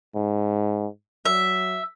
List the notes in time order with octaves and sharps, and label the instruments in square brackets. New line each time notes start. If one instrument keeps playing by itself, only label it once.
[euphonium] G#2
[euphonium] F#3 [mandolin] E5